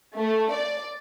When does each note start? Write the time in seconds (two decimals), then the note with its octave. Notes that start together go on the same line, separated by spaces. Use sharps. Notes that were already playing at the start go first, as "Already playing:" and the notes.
0.16 A3
0.52 D5